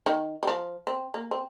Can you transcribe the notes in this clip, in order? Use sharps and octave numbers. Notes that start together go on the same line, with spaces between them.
D#3
G3
F3
C4
A#3
C4